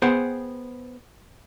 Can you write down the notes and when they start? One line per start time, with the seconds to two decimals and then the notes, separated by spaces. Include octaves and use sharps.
0.02 B3 G#4 C5 F#5 G5